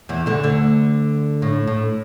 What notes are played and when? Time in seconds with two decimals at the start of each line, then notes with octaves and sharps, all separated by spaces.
0.09 E2 E3
0.26 D2 D3
0.43 D2 D3
1.42 A2
1.67 A2